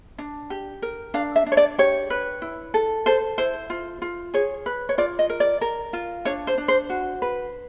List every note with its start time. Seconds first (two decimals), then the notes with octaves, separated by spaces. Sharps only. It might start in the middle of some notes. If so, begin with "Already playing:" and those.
0.18 D4
0.50 G4
0.82 A#4
1.14 D4 F5
1.36 E5
1.46 D4
1.52 C#5
1.57 D5
1.78 G4 C#5
2.10 B4
2.42 E4
2.74 A4
3.06 A4 C5
3.38 E4 C5
3.70 F4
4.02 F4
4.34 G#4 C#5
4.66 B4
4.89 C#5
4.98 F4 D5
5.19 D#5
5.29 A#4
5.40 D5
5.61 A#4
5.93 F4
6.25 D4 C#5
6.47 C5
6.58 D4
6.68 C5
6.90 F#4
7.22 B4